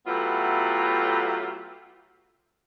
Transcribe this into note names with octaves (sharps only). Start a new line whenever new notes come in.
F#3 A3 B3 E4 F4 G4